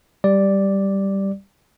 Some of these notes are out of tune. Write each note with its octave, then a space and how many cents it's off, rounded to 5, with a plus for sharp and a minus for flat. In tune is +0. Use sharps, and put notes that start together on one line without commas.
G3 +0 D5 +0